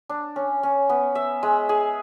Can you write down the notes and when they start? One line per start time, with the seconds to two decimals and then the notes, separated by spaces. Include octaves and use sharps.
0.09 D4
0.36 C#4
0.63 C#4
0.89 B3
1.15 E5
1.43 G#3
1.69 G#4